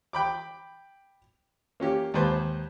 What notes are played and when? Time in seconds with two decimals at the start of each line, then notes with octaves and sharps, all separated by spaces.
0.13 G5 B5 D6
1.80 A#3 C#4 G4
2.14 D#2 G#2 B4 C5 A5